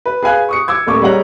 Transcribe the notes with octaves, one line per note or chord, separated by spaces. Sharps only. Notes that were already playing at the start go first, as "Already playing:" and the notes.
B4
G#4 B4 F5 G#5 B5 F#6
C#6 D#6 C#7
D6 E6 G#6
D#1 A3 C#6 D6
G3 G#3 C#5 F#5 A#5 F#7